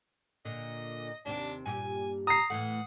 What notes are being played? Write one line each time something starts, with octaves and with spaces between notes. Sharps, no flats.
A#2 D3 D#5
D#2 C3 C4 D4
G2 A#2 G4 G#5
A#5 D#6 C7
A2 E3 A3 F#5